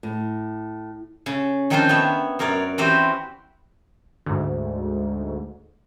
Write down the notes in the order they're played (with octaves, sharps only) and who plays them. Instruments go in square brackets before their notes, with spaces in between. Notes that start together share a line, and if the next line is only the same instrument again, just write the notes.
[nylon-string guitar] A2
[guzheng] C#3
D#3 F3 C4 D4 F4 C5
B3 C#5 E5
F#2 A#4 C#5 D5
E3 C4 F#4 G4 B4 C5
[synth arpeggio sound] D2 G#2